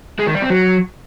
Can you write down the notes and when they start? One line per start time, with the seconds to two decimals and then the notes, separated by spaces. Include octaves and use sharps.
0.19 G#3
0.27 D#3
0.35 G3
0.42 C4
0.50 F#3